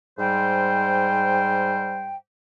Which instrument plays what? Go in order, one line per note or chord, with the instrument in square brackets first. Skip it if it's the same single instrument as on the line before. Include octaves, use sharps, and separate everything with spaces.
[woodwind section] G#2 G3 C5 G5